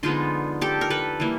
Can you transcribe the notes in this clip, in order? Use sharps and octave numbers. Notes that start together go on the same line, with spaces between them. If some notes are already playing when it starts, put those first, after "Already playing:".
D3 F3 G#3 B3 D#4 F4
G4 A4
A#4
A4 B4
E3 G3 A#3